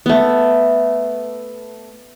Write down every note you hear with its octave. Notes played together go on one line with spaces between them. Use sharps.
A3 B3